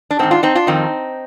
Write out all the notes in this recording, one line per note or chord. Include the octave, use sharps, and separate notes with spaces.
D4
G#2 D#3 C4 D#4
D4 F4
C4 D#4
D4 F4
F2 D#3 C4 D#4